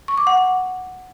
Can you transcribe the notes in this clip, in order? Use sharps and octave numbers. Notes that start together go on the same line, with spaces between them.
C#6
D6
F#5